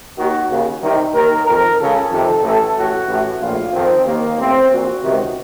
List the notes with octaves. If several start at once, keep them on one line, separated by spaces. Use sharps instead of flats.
D#2 D#3 F#4
D#2 C#3
C2 C3 D#3
D#2 D#3 A#4
F2 D#3 A#4
C#2 C#3 A4
F2 C3 D#3 A4
A1 A2 A4
A1 A2 F#4
A1 A2
A#1 A2 F4
F2 D#3 C4
D#2 D#3 A#3
A1 A2 C4
A#1 A#2 F#4
C#2 C3 D#3